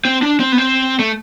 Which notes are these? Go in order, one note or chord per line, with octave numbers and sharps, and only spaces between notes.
C4
D4
C4
B3
C4
A3